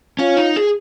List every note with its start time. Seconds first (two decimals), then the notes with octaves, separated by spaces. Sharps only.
0.19 C#4 F4 C#5 F5
0.37 D#4
0.56 G#4